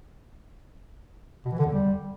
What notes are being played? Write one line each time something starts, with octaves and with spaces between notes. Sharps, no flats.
B2
E3
D3
E2
G3